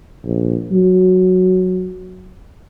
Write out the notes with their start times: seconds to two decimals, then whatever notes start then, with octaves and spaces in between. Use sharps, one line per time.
0.25 A#1
0.71 F#3